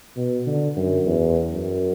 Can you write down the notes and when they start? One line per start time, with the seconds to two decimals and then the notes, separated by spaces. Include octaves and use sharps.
0.17 B2
0.46 D3
0.76 F#2
1.06 E2
1.51 F#2